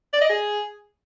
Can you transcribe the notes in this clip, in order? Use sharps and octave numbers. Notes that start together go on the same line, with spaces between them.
D5
D#5
G#4